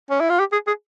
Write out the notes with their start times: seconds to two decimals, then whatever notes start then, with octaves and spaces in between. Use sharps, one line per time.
0.10 C#4
0.20 E4
0.30 F4
0.39 G4
0.53 G#4
0.67 G#4